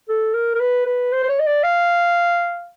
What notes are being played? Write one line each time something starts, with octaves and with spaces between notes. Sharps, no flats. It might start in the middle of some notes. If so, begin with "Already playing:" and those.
A4
A#4
A#4
B4
B4
C5
C5
C#5
D#5
D5
F5